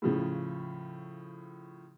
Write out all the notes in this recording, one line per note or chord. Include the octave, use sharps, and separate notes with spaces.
A2 C#3 F3